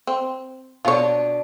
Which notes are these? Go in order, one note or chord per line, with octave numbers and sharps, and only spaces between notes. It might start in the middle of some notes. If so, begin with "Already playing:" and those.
C4
B2 D4 F4 C#5